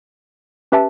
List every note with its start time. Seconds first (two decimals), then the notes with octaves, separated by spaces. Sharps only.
0.72 C#4 G4 B4 E5 A5